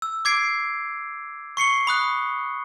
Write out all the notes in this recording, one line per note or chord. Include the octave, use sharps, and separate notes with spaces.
E6
D6 G#6 C7 D7
C#6 C7 C#7 G7
B5 D#6 F#6